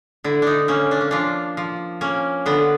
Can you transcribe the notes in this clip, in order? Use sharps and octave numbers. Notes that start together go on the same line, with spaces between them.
D3 E4
D4 D#4
A#3 C#4
D4
C#4
F3 D4
F3
A#3 C#4
D3 B3